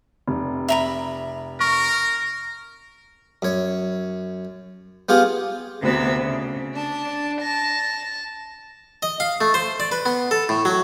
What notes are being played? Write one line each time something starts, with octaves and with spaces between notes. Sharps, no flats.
F1 C3
E5 A#5 B5
A#4 C#6
F#2 C#5
B3 F4 G4 G#4
D2 C3 B3 B4 E6
C#3
D4 A5
A5 A#6
D#5
F5
A3
C5
D5
B4
B3
A4
A2
F#3